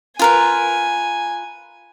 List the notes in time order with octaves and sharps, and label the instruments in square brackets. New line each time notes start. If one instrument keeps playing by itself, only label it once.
[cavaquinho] F4 A#4 B4 [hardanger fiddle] G#5